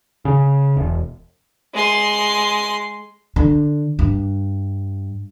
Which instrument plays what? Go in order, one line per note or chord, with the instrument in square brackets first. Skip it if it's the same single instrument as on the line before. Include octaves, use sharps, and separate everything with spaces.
[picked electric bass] C#3
E1
[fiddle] G#3 C6
[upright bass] D3
G2